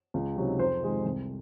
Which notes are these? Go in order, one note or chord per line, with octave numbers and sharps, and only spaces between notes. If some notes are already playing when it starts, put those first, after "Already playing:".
C#2
C3 F#3 C4 D#4
F2 C5
C3 D#3 G#3
C2